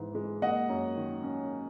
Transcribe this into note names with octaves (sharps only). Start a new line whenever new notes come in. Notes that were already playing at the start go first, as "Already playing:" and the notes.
Already playing: G#2 E3
G#3
A#3 D#5 F#5
F#2
D#3
C#4